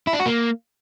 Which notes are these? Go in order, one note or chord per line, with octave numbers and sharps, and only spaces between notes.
E4
D4
F#4
A#3